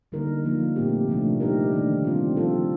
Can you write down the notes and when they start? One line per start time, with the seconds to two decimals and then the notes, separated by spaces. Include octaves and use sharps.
0.12 D3 G3 A#3 D#4 A#4
0.44 F3 A#3 D#4
0.76 A#2 A3 C4 G4
1.08 C3 F3 A3 D4
1.40 G3 A#3 D#4 G4 A#4
1.72 D#3 A3 D4
2.05 G3 C4 F4
2.37 F3 C4 F4 A4